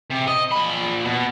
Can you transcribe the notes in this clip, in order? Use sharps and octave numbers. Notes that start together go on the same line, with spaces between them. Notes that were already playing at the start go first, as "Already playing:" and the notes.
C3
D#5
A#2 B5
B2